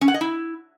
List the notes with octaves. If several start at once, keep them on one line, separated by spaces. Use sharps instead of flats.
C#4
F#5
D#5
E4